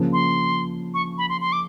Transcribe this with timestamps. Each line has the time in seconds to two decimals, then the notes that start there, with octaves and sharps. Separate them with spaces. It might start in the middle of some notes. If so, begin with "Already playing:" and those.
Already playing: C#3 F3 A#3
0.13 C6
0.94 C#6
1.18 B5
1.29 C6
1.41 C6
1.53 D6